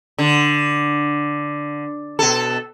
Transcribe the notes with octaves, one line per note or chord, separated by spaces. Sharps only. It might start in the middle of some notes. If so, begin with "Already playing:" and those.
D3
B2 A4